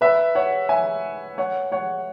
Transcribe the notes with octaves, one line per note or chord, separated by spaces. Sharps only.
B4 E5
C#5 F#5
E5 G#5
C#5 F#5
C#5 F#5